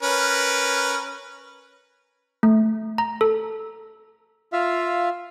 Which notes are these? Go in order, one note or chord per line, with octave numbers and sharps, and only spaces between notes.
C#4 A#4 B4
A3
A#5
A4
F4 E5 F5